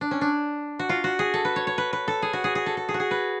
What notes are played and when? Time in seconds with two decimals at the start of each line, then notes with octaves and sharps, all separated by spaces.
0.01 D4
0.11 C#4
0.21 D4
0.79 F#4
0.89 F4
1.04 F#4
1.19 G#4
1.34 A4
1.45 B4
1.56 C#5
1.67 C#5
1.78 B4
1.93 B4
2.08 A4
2.22 G#4
2.33 F#4
2.44 G#4
2.55 G#4
2.66 A4
2.77 A4
2.89 G#4
2.94 F#4
3.00 G#4
3.11 B4